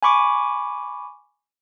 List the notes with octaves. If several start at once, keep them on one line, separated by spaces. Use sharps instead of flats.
G#5 B5 C#6 D6